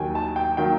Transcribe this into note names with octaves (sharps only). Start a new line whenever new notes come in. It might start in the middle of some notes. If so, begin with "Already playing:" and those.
Already playing: D#2 D#3 F#3 G5 G#5
A5
G5
D#3 F#3 A#3 G5